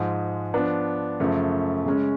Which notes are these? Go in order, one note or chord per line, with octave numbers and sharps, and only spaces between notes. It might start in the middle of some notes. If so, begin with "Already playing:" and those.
Already playing: G#2 F3 G#3
F3 B3 D4
F#2 C#3 F3 A3
C#3 G#3 C#4